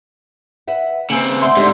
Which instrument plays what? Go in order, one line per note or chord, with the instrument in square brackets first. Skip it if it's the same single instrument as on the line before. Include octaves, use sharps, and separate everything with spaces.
[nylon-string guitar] B4 E5 F#5
[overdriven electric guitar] C#3 C4 [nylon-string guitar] A#3 [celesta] B4 G#5 F#7
[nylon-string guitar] D2 F#5 [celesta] E5 G6 [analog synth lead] C6
[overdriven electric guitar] G#2 [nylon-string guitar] D3 G3 A4 [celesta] G4 D5